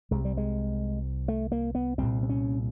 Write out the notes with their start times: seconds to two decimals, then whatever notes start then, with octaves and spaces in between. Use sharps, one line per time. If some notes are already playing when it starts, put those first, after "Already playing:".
0.11 C2 C3 G#3
0.25 G3
0.37 G#3
1.28 A3
1.52 A#3
1.75 B3
1.98 C2 A#2 C4
2.23 C4
2.29 C#4